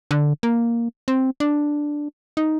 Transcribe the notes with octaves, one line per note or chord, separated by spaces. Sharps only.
D3
A#3
C4
D4
D#4